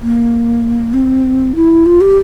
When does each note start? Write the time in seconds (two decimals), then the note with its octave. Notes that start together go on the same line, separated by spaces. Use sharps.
0.02 A#3
0.93 C4
1.55 E4
1.86 F4
2.01 G4